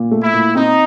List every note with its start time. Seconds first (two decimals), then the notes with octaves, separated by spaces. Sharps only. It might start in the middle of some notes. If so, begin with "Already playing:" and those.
Already playing: A#2
0.11 A3
0.22 E4
0.34 A#2
0.55 C4 D#4